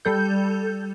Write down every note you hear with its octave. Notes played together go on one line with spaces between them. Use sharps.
G3 A4 G6